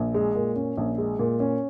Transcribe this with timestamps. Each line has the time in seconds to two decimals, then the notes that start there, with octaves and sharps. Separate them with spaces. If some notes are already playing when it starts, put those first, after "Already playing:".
Already playing: A#1
0.14 G#3
0.35 A#2
0.56 C#4
0.78 A#1
0.98 G#3
1.19 A#2
1.40 C#4